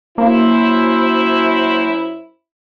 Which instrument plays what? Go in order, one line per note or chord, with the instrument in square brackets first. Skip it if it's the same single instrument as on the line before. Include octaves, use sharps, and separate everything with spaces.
[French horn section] F#2 E4 C5 [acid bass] A#3